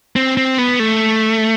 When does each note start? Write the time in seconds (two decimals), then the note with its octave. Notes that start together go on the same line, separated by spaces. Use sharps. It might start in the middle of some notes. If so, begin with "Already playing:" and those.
0.16 C4
0.37 C4
0.58 B3
0.80 A3